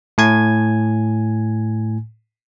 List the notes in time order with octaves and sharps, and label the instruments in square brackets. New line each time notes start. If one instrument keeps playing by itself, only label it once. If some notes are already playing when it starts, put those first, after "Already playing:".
[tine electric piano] A2 G#5 G#6